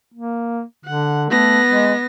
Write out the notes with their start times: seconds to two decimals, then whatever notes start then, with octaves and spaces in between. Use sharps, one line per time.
0.14 A#3
0.85 D3 F#5
1.30 A3 B3 A#6
1.68 G#3